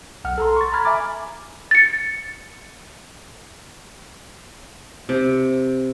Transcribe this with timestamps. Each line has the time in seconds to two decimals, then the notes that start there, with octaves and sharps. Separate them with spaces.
0.24 B1 F#5 F6
0.38 A4 A#5 C6
0.56 C#6 A6
0.72 A#5 B5 F6 G#6 A6
0.85 E5 G#5 A#5 B5 D6
1.71 A6 C#7
5.09 C3